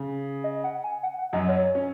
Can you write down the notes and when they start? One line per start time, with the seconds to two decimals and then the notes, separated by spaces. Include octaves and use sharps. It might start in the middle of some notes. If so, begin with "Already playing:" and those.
Already playing: C#3
0.44 D#5
0.64 F#5
0.84 G#5
1.03 F#5
1.18 F#5
1.33 F#2 F#3 D#5
1.49 C#5
1.75 C#4